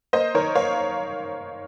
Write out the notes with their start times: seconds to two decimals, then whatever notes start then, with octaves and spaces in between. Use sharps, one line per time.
0.13 A#3 C5 D#5
0.34 D#3 A#4 C#5
0.55 A#3 C#5 F5